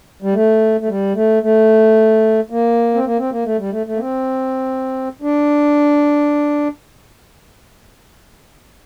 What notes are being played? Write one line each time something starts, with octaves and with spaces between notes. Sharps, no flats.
G3
A3
A3
G3
A3
A3
A#3
C4
A#3
C4
A#3
A3
G3
A3
A3
A#3
C4
D4